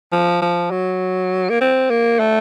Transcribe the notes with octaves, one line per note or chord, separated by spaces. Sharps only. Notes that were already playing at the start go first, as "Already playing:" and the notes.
F3
F3
F#3
A#3
C4
A#3
A3